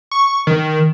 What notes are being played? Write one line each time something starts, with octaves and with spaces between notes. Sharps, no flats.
C#6
D#3